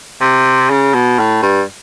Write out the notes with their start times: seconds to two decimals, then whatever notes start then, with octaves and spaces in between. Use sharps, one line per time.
0.21 C3
0.70 C#3
0.94 B2
1.19 A2
1.42 G2